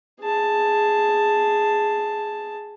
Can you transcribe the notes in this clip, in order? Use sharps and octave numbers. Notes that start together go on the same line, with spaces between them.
G#4 A5